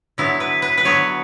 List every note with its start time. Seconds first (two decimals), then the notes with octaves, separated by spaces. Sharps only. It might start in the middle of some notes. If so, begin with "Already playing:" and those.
0.18 D3 F#3 B3 E4
0.40 B4
0.62 B4
0.77 B4
0.85 D3 F#3 B3 C#5